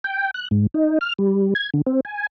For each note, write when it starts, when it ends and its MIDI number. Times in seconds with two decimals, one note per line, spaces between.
0.04 0.31 79
0.34 0.48 90
0.51 0.67 44
0.74 0.98 63
1.01 1.13 89
1.19 1.54 55
1.55 1.70 92
1.74 1.81 50
1.86 2.00 60
2.05 2.27 80